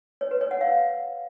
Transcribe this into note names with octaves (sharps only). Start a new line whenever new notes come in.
C#5
B4
C#5
F#5
F5